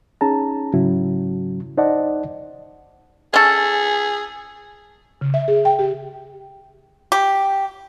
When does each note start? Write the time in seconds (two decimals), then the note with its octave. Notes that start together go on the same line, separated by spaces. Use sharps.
0.21 C#4 D#4 G#4 A5 A#5
0.74 G#2 C#3 F#3 C#4 E4 F#4
1.77 D#4 C5 D5 D#5 F#5 A5
3.34 C#4 G#4 A4
5.21 C#3
5.34 E5
5.48 G#4
5.65 G5
5.79 G4
7.12 G4